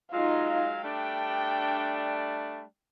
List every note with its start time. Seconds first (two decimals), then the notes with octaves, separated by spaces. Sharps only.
0.13 F#3 G#3 D#4 F4 F5
0.83 G3 A3 D4 G5